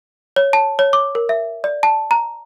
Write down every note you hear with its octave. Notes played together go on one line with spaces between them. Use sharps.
C#5
A5
C#5
D6
A#4
E5
D5
A5
A#5